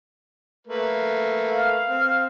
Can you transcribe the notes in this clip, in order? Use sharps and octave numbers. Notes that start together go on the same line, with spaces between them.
A3 A#3 B4
F5
C4